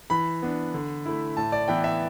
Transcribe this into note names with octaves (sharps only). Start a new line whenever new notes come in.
E3 B5
B3 D4
D3
A3 E4
A2 A5
D5
E3 B3 E4 G5
E5